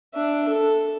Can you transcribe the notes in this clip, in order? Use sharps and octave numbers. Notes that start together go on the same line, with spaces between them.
D4 E5
A4